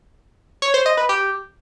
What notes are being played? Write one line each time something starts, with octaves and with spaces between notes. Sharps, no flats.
C#5
C5
D#5
B4
G4